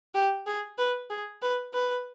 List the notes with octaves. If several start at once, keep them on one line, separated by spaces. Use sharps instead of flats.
G4
G#4
B4
G#4
B4
B4